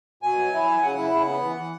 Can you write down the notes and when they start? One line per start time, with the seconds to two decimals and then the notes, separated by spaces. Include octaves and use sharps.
0.23 B2 G#5
0.37 F#3
0.53 E4
0.67 F#3
0.82 C#3 F#5
0.97 E4
1.12 C#3
1.28 B3
1.42 E3
1.57 E3